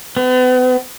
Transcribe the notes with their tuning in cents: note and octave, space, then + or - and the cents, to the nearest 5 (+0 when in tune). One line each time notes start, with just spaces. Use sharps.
B3 +40